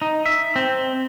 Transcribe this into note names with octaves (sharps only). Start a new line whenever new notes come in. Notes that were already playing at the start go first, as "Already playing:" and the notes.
D#4
E5
C4